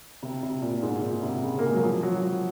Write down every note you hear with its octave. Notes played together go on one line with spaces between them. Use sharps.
C3
C3
A#2
G#2
A#2
C3
C#3
A#3
G#3
F#3
F3
F#3
F3